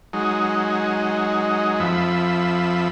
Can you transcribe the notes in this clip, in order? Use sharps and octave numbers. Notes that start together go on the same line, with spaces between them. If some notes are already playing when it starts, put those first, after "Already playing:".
F#3 G#3 D#4
F2 F3 E5 B5